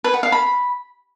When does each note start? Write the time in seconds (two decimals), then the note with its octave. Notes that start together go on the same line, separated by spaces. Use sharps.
0.04 B4
0.14 F#5
0.23 F5
0.32 B5